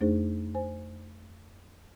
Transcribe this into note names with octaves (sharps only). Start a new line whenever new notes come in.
F2 A3 D4 D#4 G#4 C5
C5 G#5